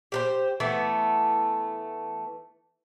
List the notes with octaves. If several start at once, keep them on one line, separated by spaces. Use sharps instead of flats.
G4 B4 C5
E3 A3 B3